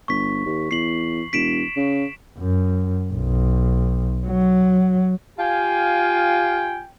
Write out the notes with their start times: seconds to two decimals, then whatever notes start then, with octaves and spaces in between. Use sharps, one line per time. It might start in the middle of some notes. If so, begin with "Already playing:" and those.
0.08 G1 C#6 B6
0.46 D#2
0.71 E2 C7 F#7
1.33 E1 B6 D7 E7
1.77 C#3
2.37 F#2
3.13 B1
4.27 F#3
5.39 F4 G4 F5 G5 G#5